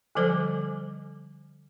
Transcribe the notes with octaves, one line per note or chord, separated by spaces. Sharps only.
D3 F3 G3 A4 C5 D6